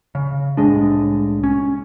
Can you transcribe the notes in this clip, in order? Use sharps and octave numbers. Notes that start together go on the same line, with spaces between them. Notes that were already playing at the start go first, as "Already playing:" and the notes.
C#3
C2 A2 G#3 D4
C#4